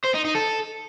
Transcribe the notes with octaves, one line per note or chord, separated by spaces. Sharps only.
C5
D#4
D#4
A4